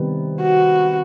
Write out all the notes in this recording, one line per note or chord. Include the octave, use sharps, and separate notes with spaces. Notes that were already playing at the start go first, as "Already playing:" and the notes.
Already playing: C3 D#3 G3 B3
F#4